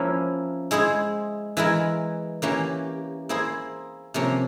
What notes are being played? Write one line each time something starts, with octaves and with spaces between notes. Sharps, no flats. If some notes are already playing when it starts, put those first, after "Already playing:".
Already playing: F3 A#3 C#4 E4
G#3 E4 G#4 C5
E3 G#3 E4 A#4
E3 A#3 C#4 G4
A#3 E4 G#4 C5
C3 F3 A#3 C#4